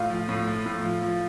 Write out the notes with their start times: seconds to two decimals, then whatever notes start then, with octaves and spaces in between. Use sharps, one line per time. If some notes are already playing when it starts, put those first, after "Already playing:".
Already playing: A2 F4
0.10 F3
0.29 A2
0.47 F3
0.66 A2
0.84 F3
1.03 F3